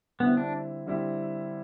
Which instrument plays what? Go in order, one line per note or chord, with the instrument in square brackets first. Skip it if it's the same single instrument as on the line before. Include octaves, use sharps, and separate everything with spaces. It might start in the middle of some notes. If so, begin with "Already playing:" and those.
[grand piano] D3 G3 C4 E4 [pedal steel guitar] B3
[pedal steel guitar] D4
[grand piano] D3 G3 C4 E4